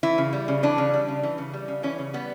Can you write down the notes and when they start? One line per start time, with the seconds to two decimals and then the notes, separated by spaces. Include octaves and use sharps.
0.03 E3 E4
0.18 C#3
0.33 G3
0.48 C#3
0.63 E3 D4
0.78 C#3
0.94 G3
1.08 C#3
1.23 E3
1.38 C#3
1.54 G3
1.68 C#3
1.83 E3 C#4
1.99 C#3
2.13 G3 B3